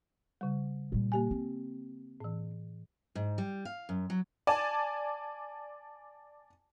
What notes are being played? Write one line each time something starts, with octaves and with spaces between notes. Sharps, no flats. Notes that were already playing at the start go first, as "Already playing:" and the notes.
C#3 G3
A#2 G3
A#3 G4 G#5
C4
A2 E3
G#2
G3
F5
F#2
F#3
D5 G#5 A5